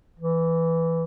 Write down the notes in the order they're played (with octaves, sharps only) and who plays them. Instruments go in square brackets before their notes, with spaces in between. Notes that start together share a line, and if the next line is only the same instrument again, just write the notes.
[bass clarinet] E3